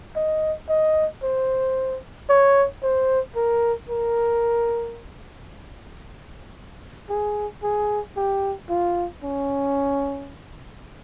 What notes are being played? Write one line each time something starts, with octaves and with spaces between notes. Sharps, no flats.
D#5
D#5
C5
C#5
C5
A#4
A#4
G#4
G#4
G4
F4
C#4